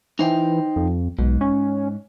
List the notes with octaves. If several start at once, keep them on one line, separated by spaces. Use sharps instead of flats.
E3 D#4 C5 G5
F2
B1 G#2
C#4